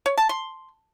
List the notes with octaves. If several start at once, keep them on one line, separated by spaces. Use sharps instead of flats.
C#5
A5
C6